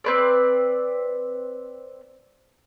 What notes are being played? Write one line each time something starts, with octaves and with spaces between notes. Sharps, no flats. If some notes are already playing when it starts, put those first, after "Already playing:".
C4 B4 D5